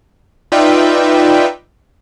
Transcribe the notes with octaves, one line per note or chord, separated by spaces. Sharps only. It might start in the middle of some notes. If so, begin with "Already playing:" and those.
D#4 F4 B4 D5 E5 G5